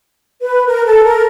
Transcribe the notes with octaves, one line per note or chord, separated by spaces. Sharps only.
B4
A#4
A4
A#4